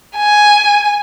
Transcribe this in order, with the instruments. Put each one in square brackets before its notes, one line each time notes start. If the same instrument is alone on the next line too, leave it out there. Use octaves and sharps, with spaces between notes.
[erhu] G#5